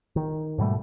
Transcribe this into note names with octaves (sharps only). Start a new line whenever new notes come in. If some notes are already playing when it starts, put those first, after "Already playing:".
D#3
G#2 B2 G3 A3